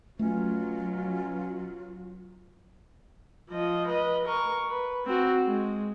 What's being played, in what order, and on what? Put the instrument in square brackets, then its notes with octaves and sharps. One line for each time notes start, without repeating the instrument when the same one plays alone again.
[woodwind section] B2 C#4 [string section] F#3 [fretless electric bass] A3 [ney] F4
[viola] F3 D#5
B4 D#5
A#4 C#6
B4
C4 F#4
G#3